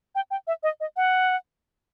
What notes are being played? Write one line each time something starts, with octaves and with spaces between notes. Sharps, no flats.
G5
G5
E5
D#5
D#5
F#5